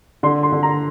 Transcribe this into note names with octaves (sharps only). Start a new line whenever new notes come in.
D3 C6
C6
D3
A#5